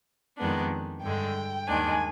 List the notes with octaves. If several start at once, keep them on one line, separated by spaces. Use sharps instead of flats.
F2 D#3 G#3 B3 D4
G2 D3 G#3 G5
D#2 D#3 G#3 D4 G#5